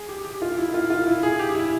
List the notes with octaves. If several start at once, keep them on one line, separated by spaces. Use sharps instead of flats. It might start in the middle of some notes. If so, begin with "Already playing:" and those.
Already playing: G#4
G4
G4
F4
E4
F4
F4
E4
G#4
G4
E4